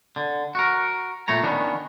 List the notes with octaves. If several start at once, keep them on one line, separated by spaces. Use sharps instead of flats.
D3
F#4 A#4
A#2 A3 C#5 A#5
D#3 B3 C#4 D4